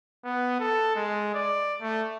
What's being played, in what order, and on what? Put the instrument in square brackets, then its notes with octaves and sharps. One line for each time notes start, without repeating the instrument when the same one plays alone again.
[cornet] B3
A4
G#3
D5
A3